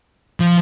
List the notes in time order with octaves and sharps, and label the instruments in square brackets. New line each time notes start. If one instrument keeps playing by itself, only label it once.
[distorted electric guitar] F3